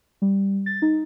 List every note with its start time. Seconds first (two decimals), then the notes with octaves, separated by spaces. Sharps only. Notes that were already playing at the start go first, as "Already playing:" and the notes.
0.22 G3
0.66 A6
0.82 D#4